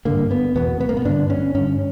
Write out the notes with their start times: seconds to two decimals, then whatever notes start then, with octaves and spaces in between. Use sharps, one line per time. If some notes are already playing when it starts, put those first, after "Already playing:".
0.05 G2 D3 A#3
0.31 B3
0.55 E2 B2 B3
0.80 B3
0.89 A#3
0.97 B3
1.05 G2 D3 D4
1.30 C#4
1.54 G2 D3 C#4